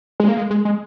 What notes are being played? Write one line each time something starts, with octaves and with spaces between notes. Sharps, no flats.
G#3
A#3
G#3
G#3
G#3